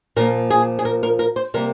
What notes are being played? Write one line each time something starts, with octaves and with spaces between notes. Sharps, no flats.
A#2 F3 A#3 A#4
G#4
G#4
A#4
A#4
A#4
C5
C3 G3 A#3 A#4